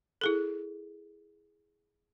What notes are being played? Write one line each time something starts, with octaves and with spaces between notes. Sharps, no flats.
E4 G#4 A4